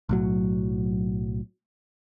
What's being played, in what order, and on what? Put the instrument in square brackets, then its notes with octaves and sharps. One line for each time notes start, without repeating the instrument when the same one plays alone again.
[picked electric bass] B1 A2 F#3